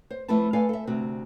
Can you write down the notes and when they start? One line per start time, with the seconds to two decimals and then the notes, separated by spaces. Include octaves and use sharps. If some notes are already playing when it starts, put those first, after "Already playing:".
0.10 C5
0.28 F2 A3 E4 A4 B4 A5
0.53 A4 B4 D5 F5 G#5
0.69 A4 E5
0.87 D2 C3 F#4